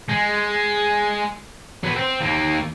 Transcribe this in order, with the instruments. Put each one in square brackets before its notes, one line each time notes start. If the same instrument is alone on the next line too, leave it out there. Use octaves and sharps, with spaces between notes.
[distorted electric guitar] G#3
F#3 B3
C4
D#2 A#3